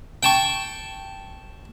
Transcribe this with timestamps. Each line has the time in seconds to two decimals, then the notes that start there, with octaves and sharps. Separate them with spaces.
0.23 G5 A5 C#6